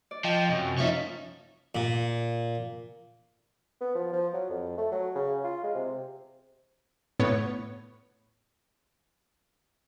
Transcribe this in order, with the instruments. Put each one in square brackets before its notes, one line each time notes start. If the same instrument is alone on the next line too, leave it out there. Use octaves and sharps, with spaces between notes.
[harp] D5
[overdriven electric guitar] F3 [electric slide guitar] D#5 G5
[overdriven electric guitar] F#2 [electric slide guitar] C3
[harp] F3 C#4 D#4 [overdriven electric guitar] C#5 E5
[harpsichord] A#2
[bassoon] B3
F3
F3
F#3
F2
A3
F#3
C#3
F4
G#3
C3
[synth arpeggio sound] A2 B3 C#5